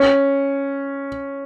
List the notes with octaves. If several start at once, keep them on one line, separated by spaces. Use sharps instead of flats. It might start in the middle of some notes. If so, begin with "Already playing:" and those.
Already playing: C#4